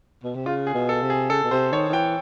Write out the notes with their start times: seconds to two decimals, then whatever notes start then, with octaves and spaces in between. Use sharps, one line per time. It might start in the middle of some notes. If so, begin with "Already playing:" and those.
0.24 B2
0.35 C3
0.46 C#3 F4
0.67 G#4
0.74 B2
0.89 A4
1.03 C3
1.10 G#4
1.30 C#3 A4
1.44 B2
1.51 C3 C5
1.72 D#3 C#5
1.89 D#3
1.93 E3 G5